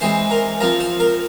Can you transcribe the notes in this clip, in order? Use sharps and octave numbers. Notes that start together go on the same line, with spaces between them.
E3 G#3 C4 C5 C6
A#4 A#5
F3 C4 A#4 A#5
C5 C6
A#4 A#5